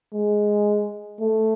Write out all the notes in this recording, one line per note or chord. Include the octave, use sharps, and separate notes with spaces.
G#3
A3